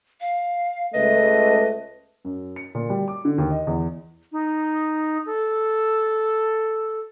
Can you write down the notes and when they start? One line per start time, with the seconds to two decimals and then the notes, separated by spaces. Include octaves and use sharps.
0.21 F5
0.94 C#2 A3 B4 D#5
2.24 F#2
2.56 C#7
2.75 A#2
2.90 G3
3.08 D6
3.25 D3
3.38 D#2
3.51 D#5
3.67 E2
4.32 D#4
5.26 A4